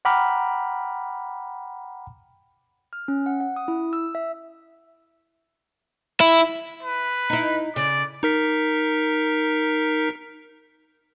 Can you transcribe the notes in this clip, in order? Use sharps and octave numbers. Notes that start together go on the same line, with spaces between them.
F#5 G5 A#5 B5 D6 F6
F6
C#4
F#5
F#5
D#6
E4
E6
E5
E4
B4
D#4 E4
C#3 D5
D#4 A#4 B6